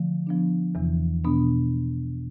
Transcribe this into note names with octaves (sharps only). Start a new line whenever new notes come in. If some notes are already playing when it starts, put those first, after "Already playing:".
Already playing: D3 F3 A3
F3 B3 D4
E2 C3 E3
B2 B3 D4